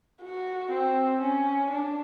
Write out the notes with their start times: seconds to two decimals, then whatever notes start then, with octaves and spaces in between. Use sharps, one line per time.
0.22 F#4
0.71 C4
1.21 C#4
1.70 D4